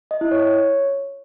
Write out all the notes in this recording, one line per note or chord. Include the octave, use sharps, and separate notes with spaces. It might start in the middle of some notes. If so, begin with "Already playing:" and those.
D#5
E4
C#5